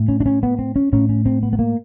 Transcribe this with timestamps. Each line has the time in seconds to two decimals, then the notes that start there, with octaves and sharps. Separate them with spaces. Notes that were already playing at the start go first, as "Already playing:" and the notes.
Already playing: A2
0.08 C#4
0.20 D4
0.26 C#4
0.43 B3
0.59 C4
0.76 C#4
0.93 A2 C#4
1.09 C#4
1.26 C4
1.43 B3
1.53 B3
1.59 A#3